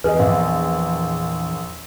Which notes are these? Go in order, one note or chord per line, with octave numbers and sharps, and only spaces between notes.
E2 G#4 B4 D#5
A#1